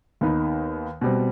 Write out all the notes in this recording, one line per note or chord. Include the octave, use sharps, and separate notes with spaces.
D#2 D#3 B3 D#4 B4
B2 G3 C4